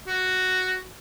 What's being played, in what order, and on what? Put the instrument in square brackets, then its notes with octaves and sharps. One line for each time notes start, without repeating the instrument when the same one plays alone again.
[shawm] F#4